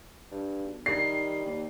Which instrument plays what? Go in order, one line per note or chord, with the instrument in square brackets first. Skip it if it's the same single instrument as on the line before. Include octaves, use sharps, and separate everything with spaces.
[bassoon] G2
[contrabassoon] B1
[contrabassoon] D#3 [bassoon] G3 [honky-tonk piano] C7
[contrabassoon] D#2